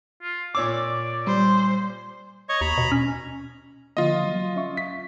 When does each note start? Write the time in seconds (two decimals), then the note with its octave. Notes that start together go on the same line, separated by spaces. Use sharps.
0.22 F4
0.55 A#2 C#5 D5 D6 E6
1.27 G3 C5
2.49 C#5 D#5 C#6
2.61 D#2 A#5 B5
2.78 B2
2.92 C#4
3.97 D3 F3 A#3 F4 D#5
4.24 F#3
4.56 C#4 E5 C#6
4.77 B6